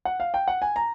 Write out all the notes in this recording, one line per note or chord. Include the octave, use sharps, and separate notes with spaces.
F#5
F5
G5
F#5
G#5
A#5